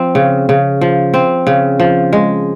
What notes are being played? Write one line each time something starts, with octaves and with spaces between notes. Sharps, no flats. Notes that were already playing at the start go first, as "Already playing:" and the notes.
Already playing: F3 C4
C#3
C#3
F3
C4
C#3
F3
G#3